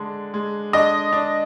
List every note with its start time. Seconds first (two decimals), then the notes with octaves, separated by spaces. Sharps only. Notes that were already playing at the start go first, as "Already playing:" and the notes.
Already playing: D3 G#3 D4
0.34 G#3
0.73 D4 D#5
1.13 D4